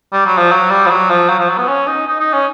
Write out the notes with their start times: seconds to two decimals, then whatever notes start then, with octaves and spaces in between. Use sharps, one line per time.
0.13 G3
0.26 F#3
0.38 F3
0.52 F#3
0.70 G3
0.86 F3
0.91 F#3
1.10 F3
1.30 F#3
1.39 F3
1.50 F#3
1.58 B3
1.68 C#4
1.88 D#4
2.07 D#4
2.21 D#4
2.33 C#4